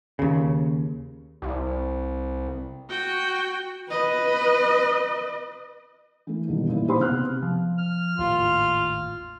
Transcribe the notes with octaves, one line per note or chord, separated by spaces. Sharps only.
D#2 C#3
C2
F#4 G5
B4 D#5
E3 A3
D#2 B2 G3
A1 A#2 E4
D#4 G4 C5 B5 C6
C3 B3 F6 F#6
F3
F6
G#1 D#2 A2 F4